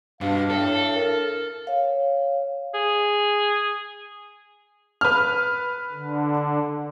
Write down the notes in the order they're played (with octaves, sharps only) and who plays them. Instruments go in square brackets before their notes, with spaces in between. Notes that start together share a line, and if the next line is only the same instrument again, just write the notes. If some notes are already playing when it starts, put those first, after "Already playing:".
[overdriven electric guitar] G2 [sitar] B2 [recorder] D4 [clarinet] F5
[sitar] A2 [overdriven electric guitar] A4
[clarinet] A#4
[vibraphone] C#5 F5
[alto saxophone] G#4
[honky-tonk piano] B4 F6
[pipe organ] D3